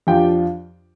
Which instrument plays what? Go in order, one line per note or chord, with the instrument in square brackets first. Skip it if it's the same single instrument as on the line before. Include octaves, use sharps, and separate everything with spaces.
[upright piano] F2 F3 D4 F4 G4 G5